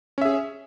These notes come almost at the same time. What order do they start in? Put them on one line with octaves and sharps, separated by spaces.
C#4 E5 G#4